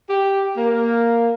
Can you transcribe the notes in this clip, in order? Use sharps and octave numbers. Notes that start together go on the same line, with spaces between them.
G4
A#3